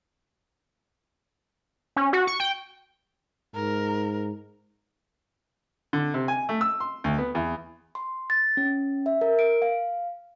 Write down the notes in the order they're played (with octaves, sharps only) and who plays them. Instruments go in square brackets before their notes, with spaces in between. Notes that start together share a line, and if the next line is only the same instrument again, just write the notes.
[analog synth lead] C#4
F#4
C#6
G5
[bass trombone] G#2 [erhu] A#4
[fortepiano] D3
C3
G#5
A3
E6
C6
D2
B3
E2
[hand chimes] C6
A6
C#4
E5
A#4
D7
F5